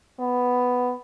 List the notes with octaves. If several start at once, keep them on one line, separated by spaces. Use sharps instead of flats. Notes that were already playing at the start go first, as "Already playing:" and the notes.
B3